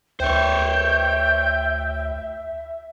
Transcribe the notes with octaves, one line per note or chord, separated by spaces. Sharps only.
D2 C5 C#5 E5 G5